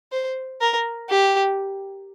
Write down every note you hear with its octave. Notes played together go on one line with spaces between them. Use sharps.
C5
A#4
G4